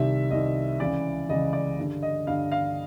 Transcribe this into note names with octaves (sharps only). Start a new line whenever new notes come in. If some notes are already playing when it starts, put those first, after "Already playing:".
Already playing: C2 C3 D#3 E5
C2 C3 D#3 D#5
C#2 C#3 E3 D5
C#2 C#3 E3 D#5
D5
G2 D3
D#5
G2 D3 F5
F5